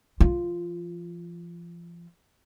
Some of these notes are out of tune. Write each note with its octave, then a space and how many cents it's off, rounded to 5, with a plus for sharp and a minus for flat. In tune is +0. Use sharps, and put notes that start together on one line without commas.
F3 -40 F4 -10